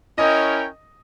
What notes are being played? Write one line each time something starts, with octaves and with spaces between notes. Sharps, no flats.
C#4 E4 A#4 C#5 D#5 G5